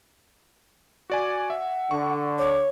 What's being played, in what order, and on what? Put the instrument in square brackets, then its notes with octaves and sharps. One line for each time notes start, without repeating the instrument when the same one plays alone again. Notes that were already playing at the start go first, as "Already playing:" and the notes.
[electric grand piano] F#4 D5 G#5 [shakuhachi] D6
[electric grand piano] E5 [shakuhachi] F#5
[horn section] D3 [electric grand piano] C#6
[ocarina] C#5 [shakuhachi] D6